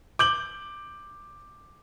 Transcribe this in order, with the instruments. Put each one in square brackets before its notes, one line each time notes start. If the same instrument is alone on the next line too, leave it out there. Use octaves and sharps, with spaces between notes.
[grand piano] D6 G6 F#7